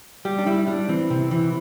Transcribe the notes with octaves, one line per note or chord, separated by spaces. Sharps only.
G3 G4
D4
G3 E4
G3 D4
E3 C4
C3
E3